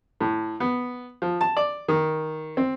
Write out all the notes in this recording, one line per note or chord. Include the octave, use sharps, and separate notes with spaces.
A2
B3
F3
A5
D5
D#3
C4